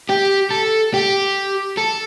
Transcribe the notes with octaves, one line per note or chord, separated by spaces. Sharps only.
G4
A4
G4
A4